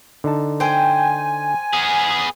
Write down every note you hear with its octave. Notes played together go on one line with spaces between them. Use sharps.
D3 D#4 A5
C5 G5 G#5
B3 G#4